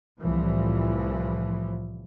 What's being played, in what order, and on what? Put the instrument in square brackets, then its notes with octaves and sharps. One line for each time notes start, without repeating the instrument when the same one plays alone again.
[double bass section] C2 A2 E3 F3